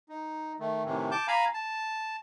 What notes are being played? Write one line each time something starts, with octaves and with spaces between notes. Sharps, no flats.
D#4
D#3 A3
A2 C3 D#3 E3
A5 D6 G6
F5 G#5 A#5 B5
A5